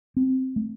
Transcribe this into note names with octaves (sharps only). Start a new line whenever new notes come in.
C4
A3